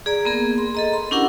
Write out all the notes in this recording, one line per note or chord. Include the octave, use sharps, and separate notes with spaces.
G#4 D5 A#5
A#3 B3 G#4 A#4
C6
A4 D#5 A#5
B5 C6
C#4 D4 E4 G4 A#4 F#5